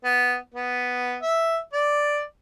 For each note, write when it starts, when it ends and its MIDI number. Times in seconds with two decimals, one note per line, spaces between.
0.04 0.36 59
0.54 1.16 59
1.22 1.58 76
1.73 2.22 74